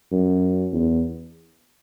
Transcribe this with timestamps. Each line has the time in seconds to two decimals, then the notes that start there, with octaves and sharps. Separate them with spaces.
0.11 F#2
0.72 E2